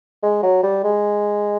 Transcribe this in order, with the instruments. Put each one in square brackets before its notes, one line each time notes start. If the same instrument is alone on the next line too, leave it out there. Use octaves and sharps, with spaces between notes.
[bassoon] G#3
F#3
G3
G#3